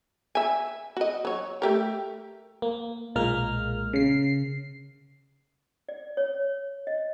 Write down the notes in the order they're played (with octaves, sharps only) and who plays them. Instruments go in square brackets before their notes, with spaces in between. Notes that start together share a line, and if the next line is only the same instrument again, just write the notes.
[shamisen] E5 G#5
F#4 D#5
F#3 C#5
A3 G4 A#4
[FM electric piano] A#3
B1 A#2 G#3 A#3 A#4 F6
C#3 C7
[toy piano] D5
C#5
D#5